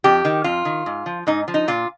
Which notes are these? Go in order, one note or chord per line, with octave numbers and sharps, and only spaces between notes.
F2 G4
D#3
F2 F4
D#3
G#2
F3
G#2 D#4
F3
D#4
A#2 F4